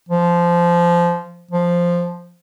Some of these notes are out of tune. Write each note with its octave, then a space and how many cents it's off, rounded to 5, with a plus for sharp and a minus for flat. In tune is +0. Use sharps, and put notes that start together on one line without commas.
F3 -15
F3 +0